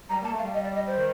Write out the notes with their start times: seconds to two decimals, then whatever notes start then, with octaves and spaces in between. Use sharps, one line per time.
0.09 G3 A#5
0.21 A#3 A5
0.31 A3
0.39 F5
0.43 G3
0.54 D#5
0.64 D5
0.75 D#5
0.87 C5
0.97 D#3